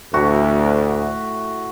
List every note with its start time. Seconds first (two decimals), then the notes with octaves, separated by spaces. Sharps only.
0.14 D2 A2 E4 F#4